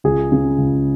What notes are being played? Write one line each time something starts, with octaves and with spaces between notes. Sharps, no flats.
C#2 G#4
C#3
C#2